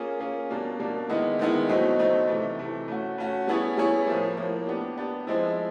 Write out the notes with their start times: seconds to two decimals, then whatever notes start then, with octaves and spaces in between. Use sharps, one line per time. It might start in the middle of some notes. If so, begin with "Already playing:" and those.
Already playing: A#3 C#4 F4 G#4
0.20 A#3 C#4 F4 G#4
0.50 B2 G3 A#3 D4
0.79 B2 G3 A#3 D4
1.10 D#3 G#3 B3 E4
1.39 D#3 G#3 B3 E4
1.69 B2 F#3 A3 C4 D#4
1.99 B2 F#3 A3 C4 D#4
2.29 C3 E3 A3
2.59 C3 E3 A3
2.88 A3 C#4 F#4
3.18 A3 C#4 F#4
3.47 G3 B3 E4 G#4 C#5
3.77 G3 B3 E4 G#4 C#5
4.07 A2 F3 A#3
4.37 A2 F3 A#3
4.67 B3 D4 G4
4.97 B3 D4 G4
5.27 F3 G#3 C4 E4